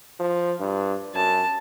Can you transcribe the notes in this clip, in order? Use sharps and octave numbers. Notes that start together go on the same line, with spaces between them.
F3
G2
F#2 A5